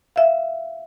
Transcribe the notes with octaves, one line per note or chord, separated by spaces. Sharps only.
E5 F5